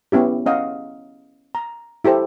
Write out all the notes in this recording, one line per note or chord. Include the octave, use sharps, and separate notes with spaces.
B3 C#4 E4 G4
C#4 D#5 F5 F#5
A#5
E4 G4 A4 C5 G5